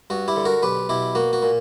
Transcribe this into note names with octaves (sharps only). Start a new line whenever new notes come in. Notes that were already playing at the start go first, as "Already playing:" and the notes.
G2 F#4
E4 G4
D3
F#4 A#4
B1 G4 B4
B2 E4 G4
A#3 F#4
F#4
A#2